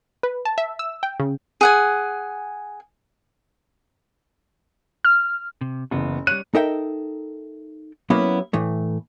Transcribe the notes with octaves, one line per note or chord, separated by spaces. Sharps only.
B4
A5
E5
E6
G5
C#3
G#4 F#5 G#5
F6
C3
F#1 E3 B3
G3 C#5 F#6 D#7
D#4 A4 A#4 E5 G5
F#3 A#3 B3 C#4 E4 F#4
A2 E3 A3